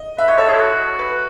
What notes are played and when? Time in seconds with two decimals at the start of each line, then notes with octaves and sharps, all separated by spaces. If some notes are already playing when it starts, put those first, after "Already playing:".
Already playing: D#5
0.18 B4 E5
0.28 C#5 D#5
0.38 A4 C#5
0.48 G#4 A4
0.54 E4
0.59 F#4
0.99 B4